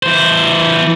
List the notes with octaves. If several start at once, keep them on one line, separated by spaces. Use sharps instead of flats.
E3 C5